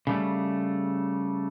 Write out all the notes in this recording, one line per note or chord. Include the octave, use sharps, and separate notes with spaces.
C#3 G3 A3